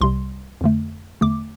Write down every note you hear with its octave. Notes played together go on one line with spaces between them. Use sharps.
C2 C3 G3 C6
F2 D3 A3
E2 D3 A3 D6